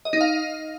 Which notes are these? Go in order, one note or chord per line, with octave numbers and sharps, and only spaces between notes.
D#5
D#4
F5